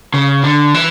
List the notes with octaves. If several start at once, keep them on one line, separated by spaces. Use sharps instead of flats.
C#3
D3
E3